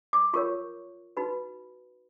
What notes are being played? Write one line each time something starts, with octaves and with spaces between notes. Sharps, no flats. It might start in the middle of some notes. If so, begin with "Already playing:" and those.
D6
F4 A#4 C#5 C#6
D#4 F#4 B4 B5